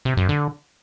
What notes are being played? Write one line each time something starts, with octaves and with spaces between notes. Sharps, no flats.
C3
F#2
D3